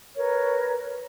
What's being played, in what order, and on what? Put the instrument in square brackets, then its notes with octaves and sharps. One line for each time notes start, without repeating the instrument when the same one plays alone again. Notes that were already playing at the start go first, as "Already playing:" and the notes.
[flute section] A#4 B4 C#5